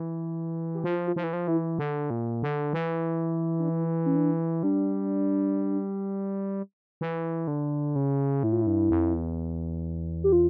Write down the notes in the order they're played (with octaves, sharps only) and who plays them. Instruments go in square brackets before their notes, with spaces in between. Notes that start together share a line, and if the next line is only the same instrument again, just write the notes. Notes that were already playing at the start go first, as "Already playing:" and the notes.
Already playing: [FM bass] E3
[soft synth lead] G4
[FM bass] F3 [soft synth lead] F4
[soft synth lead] F4
[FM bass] F3 [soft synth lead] E4
[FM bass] E3
F3
[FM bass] E3 [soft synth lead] E4
[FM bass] D3
A#2
D3
E3
[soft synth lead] D4
E4
C#4
D4
[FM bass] G3 [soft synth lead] D4
[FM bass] E3
D3
C#3
[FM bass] A2 [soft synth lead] E4
[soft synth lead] F4
E4
[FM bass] G2
F2
E2
[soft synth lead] G4
F4